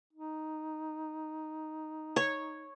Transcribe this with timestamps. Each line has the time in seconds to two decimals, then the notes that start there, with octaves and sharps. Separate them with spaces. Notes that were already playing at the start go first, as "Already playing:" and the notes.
0.13 D#4
2.16 C#5